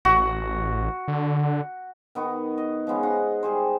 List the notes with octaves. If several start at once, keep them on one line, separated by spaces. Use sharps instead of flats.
A1 F#4
D3
D#3 B3 D#4 C#6
D#5
F3 G#3 B3 C#4
D#4 F#5 C6
G3 G#4 C5